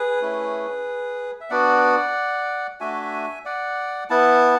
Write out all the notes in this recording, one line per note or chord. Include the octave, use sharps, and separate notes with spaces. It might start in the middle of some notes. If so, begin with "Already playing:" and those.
Already playing: G#4 B4
A3 C#4 E4
E5
B3 D4 F#4 D5 F#5
A3 D4 F#4 E5 G#5
D5 F#5
B3 E4 F#5 A5